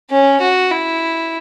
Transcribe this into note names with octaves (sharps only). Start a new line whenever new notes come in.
C#4
F#4
E4